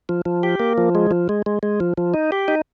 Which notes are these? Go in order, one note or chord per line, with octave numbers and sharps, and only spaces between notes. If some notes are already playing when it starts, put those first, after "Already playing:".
F3
F3
G4
A#3
F3
G#3
F3
G#3
G#3
G#3
F3
F3
D#4
G4
D#4